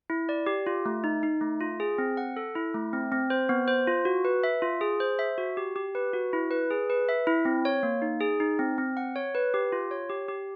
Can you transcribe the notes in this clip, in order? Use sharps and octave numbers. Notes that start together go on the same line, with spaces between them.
E4
D5
G4
F4
A3
D#4
D#4
A3
F4
G#4
C4
F#5
A4
E4
A3
C4
C4
C5
B3
C5
F4
F#4
B4
E5
F4
G#4
C5
E5
F#4
G4
G4
B4
F#4
E4
B4
G#4
B4
E5
E4
C4
C#5
A#3
D#4
G#4
D#4
C4
C4
F#5
C#5
B4
G4
F4
C#5
G4
G4